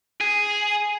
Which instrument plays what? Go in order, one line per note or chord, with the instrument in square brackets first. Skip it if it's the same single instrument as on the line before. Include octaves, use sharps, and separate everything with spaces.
[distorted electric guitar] G#4